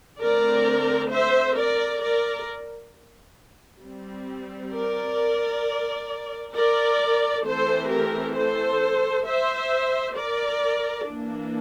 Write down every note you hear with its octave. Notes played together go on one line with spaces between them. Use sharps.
D3 A3 C4 A#4 D5
C5 E5
A#4 D5
A#4 D5
G3 C4
A#4 D5
A#4 D5
E3 A3 C4 A4 C5
G4 A#4
A4 C5
C5 E5
A#4 D5
E3 A#3 D4